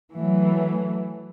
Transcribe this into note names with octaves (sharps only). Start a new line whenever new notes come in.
E3 F#3 A3